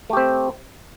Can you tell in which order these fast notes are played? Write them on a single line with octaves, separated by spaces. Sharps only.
A3 G4 C4